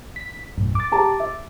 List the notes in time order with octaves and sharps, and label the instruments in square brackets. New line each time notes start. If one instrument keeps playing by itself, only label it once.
[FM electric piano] B6
B1 F#2 A2
D6 A6
[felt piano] G4 A5 A#5
E5